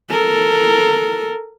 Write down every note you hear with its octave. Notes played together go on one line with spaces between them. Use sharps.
A4 A#4